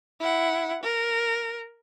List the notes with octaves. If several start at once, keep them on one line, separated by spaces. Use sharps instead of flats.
E4 F#5
A#4